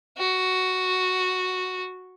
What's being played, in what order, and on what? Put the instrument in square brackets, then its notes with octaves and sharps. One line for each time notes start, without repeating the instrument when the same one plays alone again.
[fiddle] F#4